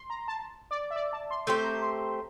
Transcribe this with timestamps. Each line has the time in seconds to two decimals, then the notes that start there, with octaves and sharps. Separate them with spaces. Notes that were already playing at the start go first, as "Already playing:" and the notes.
Already playing: C6
0.10 A#5
0.28 A5
0.71 D5
0.90 E5
0.96 D5
1.13 A5
1.31 C6
1.47 A3 C4 G4 C5 C6
1.64 A#5
1.82 C6